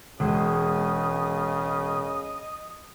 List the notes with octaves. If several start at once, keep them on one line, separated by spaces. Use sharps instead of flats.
E1 C#3 G#3 D#5